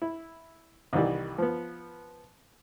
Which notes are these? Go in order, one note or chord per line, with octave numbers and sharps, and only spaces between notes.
E4
C2 D#3 E3 G3
F3 B3